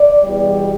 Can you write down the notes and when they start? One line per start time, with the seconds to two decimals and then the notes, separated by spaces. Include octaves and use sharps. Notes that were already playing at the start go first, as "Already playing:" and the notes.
Already playing: D5
0.23 E2 B2 G3